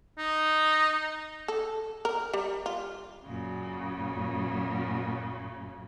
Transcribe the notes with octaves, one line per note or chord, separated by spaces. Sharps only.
D#4
A4
A#4
G3
F4
F#2 A#2 C#3